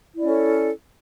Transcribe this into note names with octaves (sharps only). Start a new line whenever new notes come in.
C#4 E4 A4 D5